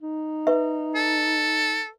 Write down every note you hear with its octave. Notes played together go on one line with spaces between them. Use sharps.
D#4
B4 E5
A4